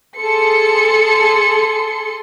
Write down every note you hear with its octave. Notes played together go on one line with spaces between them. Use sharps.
G#4 A4 C6 C#7